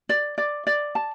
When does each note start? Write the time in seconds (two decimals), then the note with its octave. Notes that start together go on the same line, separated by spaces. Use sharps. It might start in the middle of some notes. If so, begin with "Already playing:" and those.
0.09 D5
0.38 D5
0.67 D5
0.95 A5